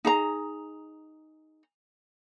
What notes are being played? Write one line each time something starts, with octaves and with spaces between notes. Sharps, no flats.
D#4 G#4 A#5